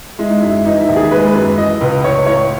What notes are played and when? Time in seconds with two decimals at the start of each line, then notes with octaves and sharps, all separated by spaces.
0.19 G#3 E4
0.30 D#4
0.41 F#2 E4
0.66 E3 D#4
0.81 E4
0.89 D#2
0.96 G#4
1.11 G#3 B4
1.27 B4
1.35 F#2
1.58 E3 D#5
1.81 C#2 B4
2.04 A2 C#5
2.15 B4
2.26 A2 C#5